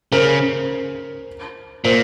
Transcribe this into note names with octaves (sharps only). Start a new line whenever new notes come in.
C#3 A#4 C5
A#2 A#4 C5